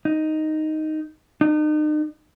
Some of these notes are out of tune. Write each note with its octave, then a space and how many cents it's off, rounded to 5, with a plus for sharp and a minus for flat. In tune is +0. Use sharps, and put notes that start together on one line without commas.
D#4 +0
D#4 -40